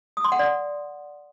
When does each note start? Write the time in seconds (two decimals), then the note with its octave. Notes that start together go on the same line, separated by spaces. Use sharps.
0.17 D#6
0.24 C6
0.32 F#5
0.39 D5